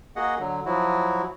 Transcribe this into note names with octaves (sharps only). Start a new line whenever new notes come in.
A#3 F#4 G#4 D#5 F#5
D3 F#3
F3 F#3 E4 F#4